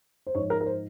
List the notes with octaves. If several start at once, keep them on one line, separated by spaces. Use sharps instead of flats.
C5
G#2 F3 C#5
A#4
A#4
C5